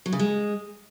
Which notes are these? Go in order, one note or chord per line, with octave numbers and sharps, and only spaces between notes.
F#3
C#3
G#3